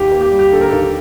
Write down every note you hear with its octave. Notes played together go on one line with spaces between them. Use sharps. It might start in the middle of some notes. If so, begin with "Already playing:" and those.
Already playing: D#2 G4
A#3
G4
G3
G4
D3 A4
A#4
D#2 A4